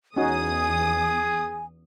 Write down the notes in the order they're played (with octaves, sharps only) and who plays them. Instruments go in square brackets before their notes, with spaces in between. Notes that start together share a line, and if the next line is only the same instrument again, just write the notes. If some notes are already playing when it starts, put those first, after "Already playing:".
[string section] E2 D#6 [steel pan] C#4 D#4 F#4 [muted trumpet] G#4 [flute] G#5